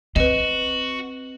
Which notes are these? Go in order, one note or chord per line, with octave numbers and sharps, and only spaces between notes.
C4 F#4 B4 D#5